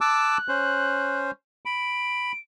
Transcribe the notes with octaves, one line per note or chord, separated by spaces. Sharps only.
A5 D6 E6 F#6
C#4 C5
B5 D7